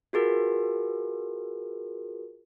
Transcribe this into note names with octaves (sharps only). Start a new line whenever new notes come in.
F4 F#4 G#4 A#4 B4